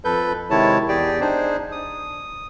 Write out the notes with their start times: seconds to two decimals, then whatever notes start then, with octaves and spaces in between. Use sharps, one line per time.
0.05 F2 A4 B4 G6
0.50 C3 D#3 G#3 E4 C#5 A5
0.89 E2 G4 G#4 D5 G5
1.21 D4 D#4 G#4 C5
1.72 D#6